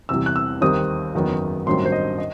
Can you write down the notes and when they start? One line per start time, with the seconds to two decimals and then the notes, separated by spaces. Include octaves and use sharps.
0.09 E2 C3 E3 G3 E6
0.26 F#6
0.36 E6
0.61 D#2 D#3 G3 C4 D#6
1.14 F#1 E2 D#3 F#3 B3
1.66 A1 G2 D#3 F#3 C4 C6
1.85 C5
1.92 D#5
2.18 D#5